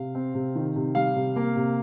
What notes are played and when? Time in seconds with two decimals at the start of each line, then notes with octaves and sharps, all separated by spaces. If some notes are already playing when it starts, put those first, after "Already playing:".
Already playing: C3 F5
0.15 C4
0.34 C3
0.55 D#3
0.76 C3
0.95 G3 F5
1.16 C3
1.36 A#3
1.56 C3